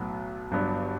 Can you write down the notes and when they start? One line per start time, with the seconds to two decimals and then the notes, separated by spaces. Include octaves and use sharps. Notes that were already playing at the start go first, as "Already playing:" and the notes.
Already playing: B1 A2 F#3 B3
0.51 G1 G2 F#3 B3 D4